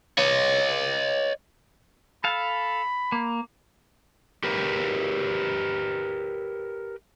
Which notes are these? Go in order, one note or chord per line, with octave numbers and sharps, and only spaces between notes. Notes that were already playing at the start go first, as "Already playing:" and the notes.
C#5 D#5
A4 F5 B5
A#3
G4 A#4 B4